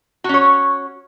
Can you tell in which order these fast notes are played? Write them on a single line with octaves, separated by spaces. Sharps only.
F#4 C#4 C#5